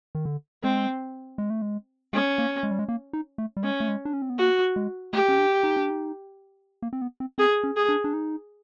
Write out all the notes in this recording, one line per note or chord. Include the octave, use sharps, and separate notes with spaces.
D#3
D3
G#3 C4
G#3
A3
G#3
G#3 C#4
A#3
G#3
G3
G#3
A#3
D#4
A3
G3
G#3 C#4
A3
G#3
D4
C#4
C4
B3
A#3 F#4
G#3
A3 G4
C#4
D4
D#4
D4
D#4
A#3
C4
B3
C4
C4 G#4
C#4
G#4
D4
D4
D#4